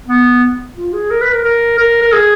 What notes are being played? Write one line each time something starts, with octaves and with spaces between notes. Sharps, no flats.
B3
F4
G#4
A#4
B4
A#4
A#4
A#4
A#4
G#4